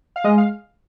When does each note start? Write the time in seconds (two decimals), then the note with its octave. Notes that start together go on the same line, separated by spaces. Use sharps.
0.16 F5
0.24 G#3 D#5
0.38 F5